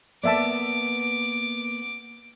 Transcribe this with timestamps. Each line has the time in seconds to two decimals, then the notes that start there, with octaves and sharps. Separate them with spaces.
0.24 A#3 B3 D5 E5 A5 D6